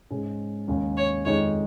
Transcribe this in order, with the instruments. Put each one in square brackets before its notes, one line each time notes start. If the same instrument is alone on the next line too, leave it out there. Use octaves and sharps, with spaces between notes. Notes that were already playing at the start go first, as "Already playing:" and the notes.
[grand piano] G#2 G#3 C#4
D#2 C#3 G#3 C#4 G#4
[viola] C#5
[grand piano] F2 D#3 G#3 D#4 G#4 [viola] C#5